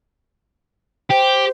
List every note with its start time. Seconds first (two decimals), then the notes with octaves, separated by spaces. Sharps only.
1.10 G4 C5